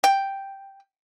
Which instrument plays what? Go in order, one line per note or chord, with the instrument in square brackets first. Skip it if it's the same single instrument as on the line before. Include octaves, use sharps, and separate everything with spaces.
[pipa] G5